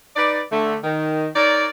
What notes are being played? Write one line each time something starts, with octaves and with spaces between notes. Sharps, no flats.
D#4 B4 D5
D3 A3
D#3
D#4 A#4 C#5 D5